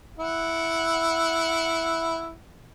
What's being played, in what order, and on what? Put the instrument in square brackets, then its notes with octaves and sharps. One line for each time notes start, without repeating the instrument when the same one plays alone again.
[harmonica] E4 F#5